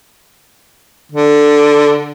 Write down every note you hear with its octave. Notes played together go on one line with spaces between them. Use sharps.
D3